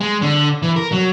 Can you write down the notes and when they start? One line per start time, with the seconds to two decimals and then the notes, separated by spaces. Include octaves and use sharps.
0.01 G#3
0.22 D3
0.62 E3
0.76 A#4
0.92 F#3